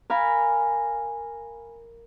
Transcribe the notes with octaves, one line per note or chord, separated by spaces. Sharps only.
A#4 F5 G#5 B5